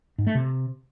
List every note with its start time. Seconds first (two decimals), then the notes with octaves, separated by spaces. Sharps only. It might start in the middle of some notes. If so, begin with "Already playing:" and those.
0.18 G#2
0.27 A3
0.35 C3